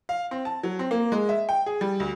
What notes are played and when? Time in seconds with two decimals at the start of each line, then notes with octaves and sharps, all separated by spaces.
0.09 F5
0.31 C4
0.45 A5
0.63 F#3
0.79 C4
0.91 A#3
1.12 G#3
1.29 E5
1.49 G5
1.66 G#4
1.81 G3
2.00 D2